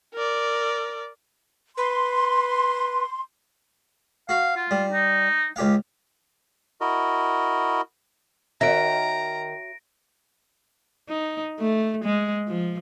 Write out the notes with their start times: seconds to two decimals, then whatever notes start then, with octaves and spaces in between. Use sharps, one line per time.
0.14 A#4 D5
1.77 B4 C6
4.29 F#4 F5
4.56 F4
4.71 G3
4.92 D#4
5.56 C#2 G4 F5
6.81 E4 F#4 A#4 D#5
8.61 D#3 F#4 C#5 E5 A#5 A#6 D7
11.09 D#4
11.59 A3
12.05 G#3
12.48 F3